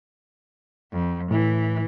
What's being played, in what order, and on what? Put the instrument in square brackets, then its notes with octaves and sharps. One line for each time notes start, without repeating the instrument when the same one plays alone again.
[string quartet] F2
[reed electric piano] A2 [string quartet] E3